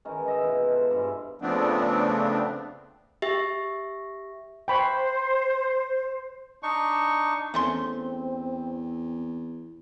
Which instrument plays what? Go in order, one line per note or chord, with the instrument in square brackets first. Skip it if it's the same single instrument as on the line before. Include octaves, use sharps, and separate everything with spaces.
[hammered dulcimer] D#3 E3 G#3 C#4
D#5 E5 B5
B2 E3 E4 F4
A4 C5
G2 G#3 E4
[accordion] C#3 F3 A3 B3 C4 D4
[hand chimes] G4 E5
[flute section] C5 [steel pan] G5 B5 C#6
[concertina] D4 D#4 C#6
[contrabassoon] E2 [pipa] A3 C#4 C6 [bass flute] C4